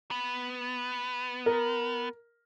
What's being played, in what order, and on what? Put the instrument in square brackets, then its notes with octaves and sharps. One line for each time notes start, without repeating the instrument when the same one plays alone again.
[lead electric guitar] B3
[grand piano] A#4